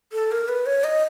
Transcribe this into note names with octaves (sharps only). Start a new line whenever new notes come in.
A4
A#4
B4
C#5
D#5